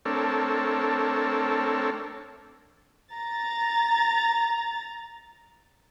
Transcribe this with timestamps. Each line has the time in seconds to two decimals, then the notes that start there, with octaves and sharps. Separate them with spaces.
0.05 A3 C4 D4 A4 A#4 C#5
3.11 A#5 A6